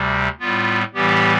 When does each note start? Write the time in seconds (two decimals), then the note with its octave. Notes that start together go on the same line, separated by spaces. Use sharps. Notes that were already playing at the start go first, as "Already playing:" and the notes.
Already playing: D2 C3 G3
0.40 A2 G3 B3 F4
0.94 A2 E3 G3 B3 G4